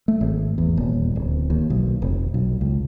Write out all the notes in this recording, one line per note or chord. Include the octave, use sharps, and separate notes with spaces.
A3
G#1
E2
D#1
D1
D#2
B1
F1
B1
C#2